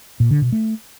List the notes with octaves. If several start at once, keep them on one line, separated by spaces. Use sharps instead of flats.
A#2
D3
B2
A3